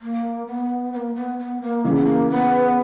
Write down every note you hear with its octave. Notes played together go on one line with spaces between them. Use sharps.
A#3
B3
B3
A#3
B3
B3
A#3
C#3 E3 A#3
B3
A#3
B3